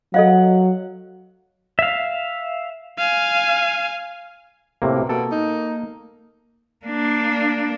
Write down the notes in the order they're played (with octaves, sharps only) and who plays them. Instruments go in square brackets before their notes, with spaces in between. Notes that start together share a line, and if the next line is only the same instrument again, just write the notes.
[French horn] F#3 [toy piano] A4 D#5 F5 [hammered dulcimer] F#5
[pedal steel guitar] E5 F5
[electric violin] F5 G#5
[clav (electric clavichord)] A2 C3 A#3
[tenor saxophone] B2
[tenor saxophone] B2 [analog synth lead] A#3 [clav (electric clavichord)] A4
[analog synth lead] A#3 [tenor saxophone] D#4
[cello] A#3 D4